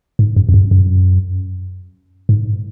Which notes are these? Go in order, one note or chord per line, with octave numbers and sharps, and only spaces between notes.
G#2
F#2
F2
F#2
F#2
G#2